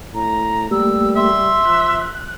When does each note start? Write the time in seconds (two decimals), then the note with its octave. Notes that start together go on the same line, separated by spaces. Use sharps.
0.14 A2 A#5
0.71 G3 A3 A#3 G4 E6
1.16 E5 C6
1.65 F3 F#6